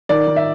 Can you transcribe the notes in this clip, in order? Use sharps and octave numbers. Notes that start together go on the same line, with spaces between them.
D#3 D5
D#3
E5